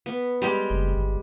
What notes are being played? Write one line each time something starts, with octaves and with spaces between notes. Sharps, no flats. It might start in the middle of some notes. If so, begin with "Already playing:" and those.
B3
G3 G#3 G4
F#1
G1